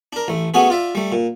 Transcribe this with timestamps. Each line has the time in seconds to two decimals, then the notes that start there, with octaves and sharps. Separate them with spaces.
0.13 D4 A#4
0.28 A1 A3
0.54 A3 B3 C#4 F#4 G#4 B4
0.70 F4 D5 E5
0.95 G3 A3
1.12 A#2